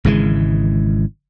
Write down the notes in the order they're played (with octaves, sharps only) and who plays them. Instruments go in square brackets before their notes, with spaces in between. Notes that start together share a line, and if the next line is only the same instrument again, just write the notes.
[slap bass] G#1 C#3 E3 G#3